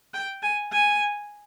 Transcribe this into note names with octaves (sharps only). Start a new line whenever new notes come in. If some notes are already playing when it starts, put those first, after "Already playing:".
G5
G#5
G#5